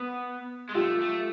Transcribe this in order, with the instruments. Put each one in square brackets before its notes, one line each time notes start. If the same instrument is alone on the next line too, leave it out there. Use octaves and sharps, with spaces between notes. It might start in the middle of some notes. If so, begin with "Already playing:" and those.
Already playing: [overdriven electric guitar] B3
G#3
[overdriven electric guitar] A3 [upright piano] F4 G4
[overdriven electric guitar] A3